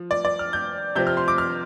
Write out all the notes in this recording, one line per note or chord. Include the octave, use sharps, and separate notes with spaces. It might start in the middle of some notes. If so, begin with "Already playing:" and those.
Already playing: F3
D5
D5
F6
G6
C3 F3 C4 G6
F6
C6
D6
F6